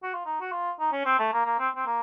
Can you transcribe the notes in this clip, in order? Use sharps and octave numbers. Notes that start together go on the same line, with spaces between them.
F#4
F4
D#4
F#4
F4
D#4
C#4
C4
A3
A#3
A#3
C4
C4
A#3